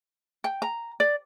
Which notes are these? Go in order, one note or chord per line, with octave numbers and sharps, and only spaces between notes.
G5
A#5
D5